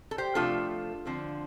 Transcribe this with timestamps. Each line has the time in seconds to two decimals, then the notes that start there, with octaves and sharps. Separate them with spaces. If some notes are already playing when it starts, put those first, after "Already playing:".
0.11 A4
0.18 G4 C5
0.35 C3 F3 A3 D4 F4 A4
1.05 D3 F3 C4